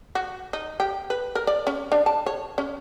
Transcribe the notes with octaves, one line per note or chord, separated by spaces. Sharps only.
F#4
D#4
G4
B4
A#4
D5
C#4
D4
A5
C#5
C#4